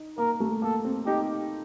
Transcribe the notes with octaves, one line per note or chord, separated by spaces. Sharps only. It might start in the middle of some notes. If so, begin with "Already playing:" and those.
Already playing: D#4
A#3 A#4
A3
A#3 A4
C4
D#4 G4